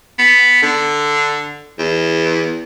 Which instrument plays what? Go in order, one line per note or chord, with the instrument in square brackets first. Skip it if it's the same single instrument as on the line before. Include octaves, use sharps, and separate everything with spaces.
[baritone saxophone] B3
D3
E2